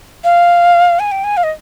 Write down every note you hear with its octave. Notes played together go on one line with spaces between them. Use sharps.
F5
G#5
G5
G#5
F5
D#5